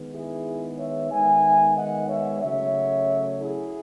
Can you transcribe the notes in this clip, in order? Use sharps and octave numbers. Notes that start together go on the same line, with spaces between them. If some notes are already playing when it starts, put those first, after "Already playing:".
Already playing: D#3 G#3 B3
E4 G#4
C#5 E5
D#3 G#3 B3 E5 G#5
D#5 F#5
C#5 E5
C#3 F#3 A3 C#5 E5
E4 G#4